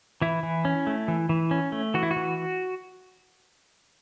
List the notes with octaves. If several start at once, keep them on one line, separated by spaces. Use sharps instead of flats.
E3 E4
E3
C#4
A3
E3
E3
C#4
A3
E3 F#4
E4
F#4
E3